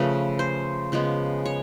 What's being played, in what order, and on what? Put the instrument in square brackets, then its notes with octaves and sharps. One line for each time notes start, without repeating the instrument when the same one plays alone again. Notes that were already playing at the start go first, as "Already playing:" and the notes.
Already playing: [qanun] C#3 F3 A3 B4
C5
C#3 F3 G#3 B3
C#5